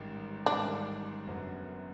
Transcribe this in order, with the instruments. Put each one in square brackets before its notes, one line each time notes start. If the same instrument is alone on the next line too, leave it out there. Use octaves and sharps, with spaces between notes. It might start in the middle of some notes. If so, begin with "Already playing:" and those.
Already playing: [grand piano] A1 G#2 D#3 G3
[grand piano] A1 G#2 D#3 G3 [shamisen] D4
[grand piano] F#1 F#2 D3 F#3 B3